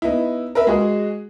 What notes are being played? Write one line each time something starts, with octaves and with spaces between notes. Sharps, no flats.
B3 D#4 E4
A#4 B4 E5
G#3 F#4 G#4